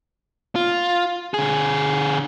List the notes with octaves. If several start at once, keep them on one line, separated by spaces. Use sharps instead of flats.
F4
D3 G#4